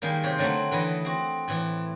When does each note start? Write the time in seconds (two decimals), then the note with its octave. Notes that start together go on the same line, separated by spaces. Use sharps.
0.02 D#3 G3 G#3 A#3
0.23 C3 C5 C#5 G5
0.38 D3 F#3 A3 C4 F#4
0.71 D3 E3 B4 D#5
1.05 C4 F#4
1.48 A2 E3